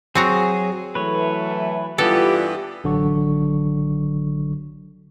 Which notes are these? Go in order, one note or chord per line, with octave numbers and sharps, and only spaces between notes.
F#3 C4 F#4 G#4 A#5
E3 F#3 A3 B4 C#5
G2 E3 G3 B3 F4 G4 A4
A1 D3 F#3 C#6